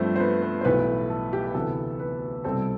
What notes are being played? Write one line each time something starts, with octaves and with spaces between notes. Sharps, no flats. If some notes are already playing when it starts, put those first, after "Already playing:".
Already playing: G2 F3 A3 C4 C5
C5
B3 B4
B3 B4
C5
B1 A2 E3 A3 B3 B4
A4
G4
B4
D2 C3 E3 B3 A4
B3 B4
C2 B2 G3 C4 A4